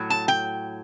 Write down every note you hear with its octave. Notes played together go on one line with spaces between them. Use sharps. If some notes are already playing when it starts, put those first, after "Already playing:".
Already playing: A2 F#3
A5
G5